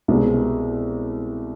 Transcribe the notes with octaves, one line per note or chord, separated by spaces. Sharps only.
C2 B2 G#3